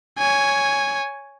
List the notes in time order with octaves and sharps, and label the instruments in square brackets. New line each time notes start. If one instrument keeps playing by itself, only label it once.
[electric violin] C#5 G#5